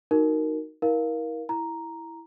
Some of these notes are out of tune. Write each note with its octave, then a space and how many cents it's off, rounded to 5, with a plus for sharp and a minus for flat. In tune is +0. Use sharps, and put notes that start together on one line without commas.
D#4 +0 F#4 +0 A#4 +0
E4 -40 A#4 +20 F5 +0
E4 +0 A#5 +0